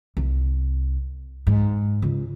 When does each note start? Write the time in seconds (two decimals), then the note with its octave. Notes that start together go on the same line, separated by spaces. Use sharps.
0.17 C2
1.47 G#2
2.02 C#2